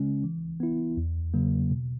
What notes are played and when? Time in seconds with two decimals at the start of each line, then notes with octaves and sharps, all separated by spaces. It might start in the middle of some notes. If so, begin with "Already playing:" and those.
Already playing: C#3 G#3 C#4
0.24 E3
0.60 B3 E4
0.97 E2
1.34 C#3 F#3 A#3
1.70 B2